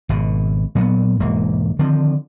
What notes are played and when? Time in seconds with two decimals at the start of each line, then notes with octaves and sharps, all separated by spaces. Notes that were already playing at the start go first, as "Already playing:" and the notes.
0.09 G#1 B2
0.75 A#2 F#3 G3 B3
1.20 E1 G#2 E3 A#3
1.79 D3 D#3 F3 C4